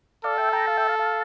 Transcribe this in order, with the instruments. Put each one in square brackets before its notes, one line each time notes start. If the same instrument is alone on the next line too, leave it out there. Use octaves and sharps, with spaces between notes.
[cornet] A4 [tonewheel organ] D5 F5
[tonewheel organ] E5 G5
G5 A#5
F5 A5
E5 G5
F5 A5
F5 A5